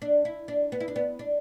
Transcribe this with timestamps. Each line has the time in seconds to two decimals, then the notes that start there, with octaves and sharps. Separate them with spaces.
0.02 D4
0.25 E4
0.48 D4
0.72 B3
0.80 E4
0.88 D4
0.96 B3
1.19 D4